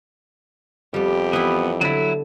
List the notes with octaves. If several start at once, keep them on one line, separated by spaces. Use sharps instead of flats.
F2 G3 B3 G4
E3 B3 E4
D3 F#3 E4